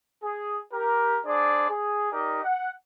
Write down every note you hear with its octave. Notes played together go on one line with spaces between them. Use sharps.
G#4
G4 A#4
D4 G#4 C5 D5
G#4
D#4 G4 A#4 D5 D#5
F#5